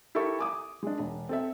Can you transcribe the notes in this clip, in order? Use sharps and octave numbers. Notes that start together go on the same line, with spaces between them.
E4 G4 A4 A#4 E5 C#6
G#5 D6 D#6
G#3 D4
E1
C4 A4 E5